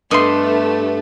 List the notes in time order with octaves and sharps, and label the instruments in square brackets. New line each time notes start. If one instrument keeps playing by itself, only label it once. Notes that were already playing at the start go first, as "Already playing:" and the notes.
[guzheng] G2 [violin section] A3 B3 [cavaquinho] D#5 C6